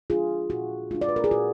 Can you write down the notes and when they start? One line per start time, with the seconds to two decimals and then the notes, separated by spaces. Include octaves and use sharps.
0.10 G#3 D4 F4 G#4
0.50 A#2 F#4
0.91 G#3 D4 F4
1.01 D5
1.09 B4
1.16 A#4
1.24 G#4
1.31 A#2 F#4